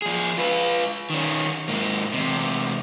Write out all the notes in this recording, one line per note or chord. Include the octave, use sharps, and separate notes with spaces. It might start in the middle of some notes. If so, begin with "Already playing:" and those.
F3 G#4
F4 B4
D#3 C#4
G#2 A#3
E2 C3